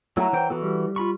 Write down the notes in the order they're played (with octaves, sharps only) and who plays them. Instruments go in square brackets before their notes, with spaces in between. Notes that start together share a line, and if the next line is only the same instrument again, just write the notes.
[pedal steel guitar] F#3 A3 E4 [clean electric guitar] C#5 F#5 A#5
[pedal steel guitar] E3 C5 G5
[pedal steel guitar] E3 F#4 A4 [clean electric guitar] B3
[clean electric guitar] G3
[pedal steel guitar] F4 B5 C#6